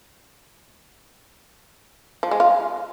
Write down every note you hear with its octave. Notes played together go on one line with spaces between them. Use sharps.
F3
G#3
F4